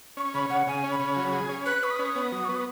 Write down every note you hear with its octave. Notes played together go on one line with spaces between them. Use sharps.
C#4 C#6
C#3 B5
C#3 F#5
C#3 G#5
C#4
B5
C#3
F#3
G#4
C#4
B4 F#6
B4 C#6
D#6
C#4
B3
F#3
B3 C#6
D#6